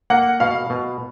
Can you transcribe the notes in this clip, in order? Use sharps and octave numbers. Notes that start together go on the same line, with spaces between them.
A#3 F#5
B2 F5
B2